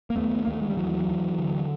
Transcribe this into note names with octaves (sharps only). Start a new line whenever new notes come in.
A#3
D#2 A3 B3
D#2 A#3
A3
G#3
G3
D#2 E3 F#3
D#2
D3